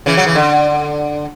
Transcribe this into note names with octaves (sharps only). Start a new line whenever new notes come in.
C#3 E3
F#3
E3
D3